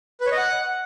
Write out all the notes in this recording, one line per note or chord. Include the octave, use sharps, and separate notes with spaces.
B4
C#5
D#5
F#5